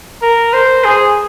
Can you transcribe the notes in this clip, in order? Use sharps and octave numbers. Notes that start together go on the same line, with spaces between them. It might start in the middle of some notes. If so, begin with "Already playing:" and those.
A#4
C5
G#4